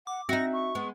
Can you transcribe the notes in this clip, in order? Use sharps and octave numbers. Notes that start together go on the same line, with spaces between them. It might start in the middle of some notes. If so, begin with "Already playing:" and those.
F#5 D6
C4 D#4 F#4 E5 A#6
C#6
G#3 B3